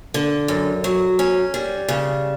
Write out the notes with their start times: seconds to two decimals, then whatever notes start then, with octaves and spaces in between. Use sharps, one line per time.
0.14 D3
0.48 F#2
0.84 F#3
1.19 C#4
1.54 G3
1.88 C#3